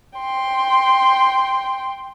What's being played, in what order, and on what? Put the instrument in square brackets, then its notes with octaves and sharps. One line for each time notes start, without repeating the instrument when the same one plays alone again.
[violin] G5 C6